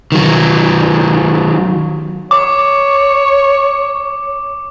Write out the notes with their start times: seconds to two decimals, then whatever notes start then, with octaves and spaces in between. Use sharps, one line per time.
0.12 D#3 F#3
2.31 C#5 D6